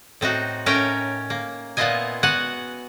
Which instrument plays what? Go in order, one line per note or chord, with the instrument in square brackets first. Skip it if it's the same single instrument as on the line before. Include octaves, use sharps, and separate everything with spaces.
[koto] A2 C4 D#4 F#4
A2 C#4 A#4 C#5 G5
A#3
A#2 B3 E4 F4 D#5 G#5
B3 F#4 F#5 G#5